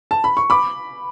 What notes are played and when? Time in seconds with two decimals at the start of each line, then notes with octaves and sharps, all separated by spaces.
0.11 A5
0.24 B5
0.37 C#6
0.50 B5 D6